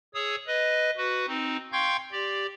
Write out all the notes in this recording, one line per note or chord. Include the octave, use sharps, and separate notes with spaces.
G#4 C#5 D#6 E6
B4 D#5
F#4 B4
C4 D#4
F5 G5 C6 C#6 G6 G#6
G4 D5